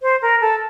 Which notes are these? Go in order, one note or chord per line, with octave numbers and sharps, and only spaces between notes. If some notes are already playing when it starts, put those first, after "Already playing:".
C5
A#4
A4